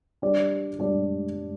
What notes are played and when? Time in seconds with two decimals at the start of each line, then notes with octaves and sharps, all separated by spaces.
0.22 G3 D4 G4 D5
0.79 G3 D4 G4 D5